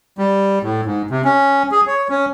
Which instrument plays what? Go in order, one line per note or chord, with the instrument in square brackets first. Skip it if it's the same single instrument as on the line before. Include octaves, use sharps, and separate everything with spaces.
[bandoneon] G3
A2
G#2
C3
C#4
G#4
C#5
C#4